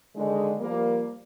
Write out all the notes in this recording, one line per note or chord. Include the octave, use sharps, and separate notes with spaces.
D3 D#3 G#3
F3 G3 A#3